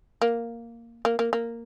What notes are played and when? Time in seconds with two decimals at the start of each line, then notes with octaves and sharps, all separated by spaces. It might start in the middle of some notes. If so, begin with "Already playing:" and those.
0.22 A#3
1.05 A#3
1.19 A#3
1.33 A#3